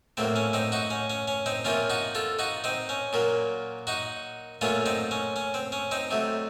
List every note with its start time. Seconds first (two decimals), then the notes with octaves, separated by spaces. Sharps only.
0.17 A2 F#3 A#3 C4
0.36 C#4
0.53 C4 D#4
0.72 D#4 F#4
0.90 C#4
1.10 C#4
1.28 C#4
1.46 C4 D#4
1.65 C3 F3 A#3 C#4 F4
1.90 D#4 F#4
2.15 F4 A4
2.39 D#4 F#4
2.64 C4 D#4
2.89 C#4
3.13 A#2 F#3 A#3
3.87 D#4 F#4
4.61 A#2 F#3 A3 C#4 F4
4.86 C4 D#4
5.11 C#4
5.36 C#4
5.54 C4
5.72 C#4
5.91 C4 D#4
6.11 C3 F#3 A3